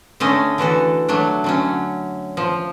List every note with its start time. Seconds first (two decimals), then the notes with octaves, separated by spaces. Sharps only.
0.20 D3 A3 C#4 D#5
0.58 D3 E3 F#4 A4
1.08 F#3 A3 D4
1.44 D3 F#3 C#4
2.37 F3